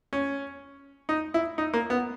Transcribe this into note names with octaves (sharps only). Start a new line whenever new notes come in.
C#4
D#4
E4
D#4
A#3
B3